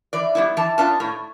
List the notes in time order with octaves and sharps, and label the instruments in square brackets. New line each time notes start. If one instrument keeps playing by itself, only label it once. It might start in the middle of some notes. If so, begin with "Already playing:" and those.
[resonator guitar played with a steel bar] E3 D5
G3 B3 E4
E3 A5
B3 D4 F4 A5
A2